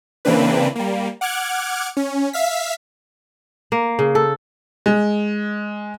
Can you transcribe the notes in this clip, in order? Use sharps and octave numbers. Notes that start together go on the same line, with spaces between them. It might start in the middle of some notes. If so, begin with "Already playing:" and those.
C#3 E3 A#3 C4 D4 B4
G3 A#3
F#5 D6 F6 F#6 G#6
C#4
E5 F5 B6
A#3
C#3
A4
G#3